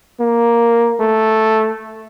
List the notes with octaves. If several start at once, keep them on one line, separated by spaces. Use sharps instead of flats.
A#3
A3